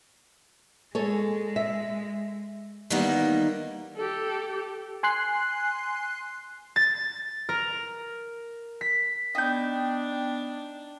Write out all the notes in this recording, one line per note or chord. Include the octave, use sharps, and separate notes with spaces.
G#3 G#4 A4 C#5
E5
D#3 E3 G3 A#3 B3 D#4
G4 A4
G#5 C6 F#6 C7
A6
A#4
B6
B3 D4 D#4 G5 G6